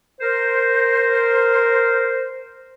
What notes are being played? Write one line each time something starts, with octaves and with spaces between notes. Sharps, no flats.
A#4 C5